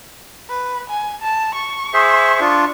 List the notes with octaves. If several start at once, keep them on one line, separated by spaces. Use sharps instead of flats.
B4
G#5
A5
C#6
G#4 C5 E5
D4 F4